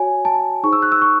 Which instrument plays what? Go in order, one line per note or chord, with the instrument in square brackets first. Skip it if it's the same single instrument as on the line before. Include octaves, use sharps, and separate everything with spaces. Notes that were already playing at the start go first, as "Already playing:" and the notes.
Already playing: [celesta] F#4 C#5 G#5
A5
D#4 G#4 C5 C#6
E6
F#6
E6
C#6